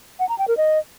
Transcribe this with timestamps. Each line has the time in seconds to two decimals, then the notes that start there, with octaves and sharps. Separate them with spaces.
0.19 F#5
0.29 A#5
0.38 G5
0.48 A#4
0.57 D#5